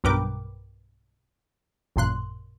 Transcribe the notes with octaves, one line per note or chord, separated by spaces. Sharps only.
B1 G2 A#4 B4 G5 D6
A1 F#2 A#2 C6 F#6